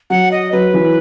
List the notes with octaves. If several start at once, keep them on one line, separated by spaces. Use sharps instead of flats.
F#3 F#5
D#5
F#3 B4
E3